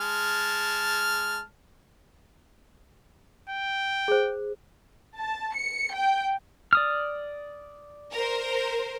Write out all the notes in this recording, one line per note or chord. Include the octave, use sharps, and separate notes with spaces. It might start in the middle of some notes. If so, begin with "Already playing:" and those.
G#3 A5 F6
G5
G#4 C5
A5
C#7
G5
D5 D#6 F6
A#4 C5